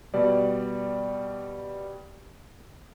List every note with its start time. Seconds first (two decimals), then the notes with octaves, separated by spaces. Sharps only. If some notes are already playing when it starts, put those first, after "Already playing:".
0.14 B2 G3 D5